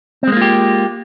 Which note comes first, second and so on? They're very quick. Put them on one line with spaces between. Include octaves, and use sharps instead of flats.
C4 G#3 A#3 F4 G4